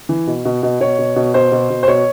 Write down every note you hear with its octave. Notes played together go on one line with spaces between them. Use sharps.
E3
B2
B2
B2
B2 C#5
B2
B2
B2 C5
B2
B2
C5
B2 C#5